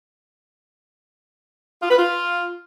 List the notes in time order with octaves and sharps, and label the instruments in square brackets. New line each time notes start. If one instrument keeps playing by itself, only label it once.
[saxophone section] F4
B4
F4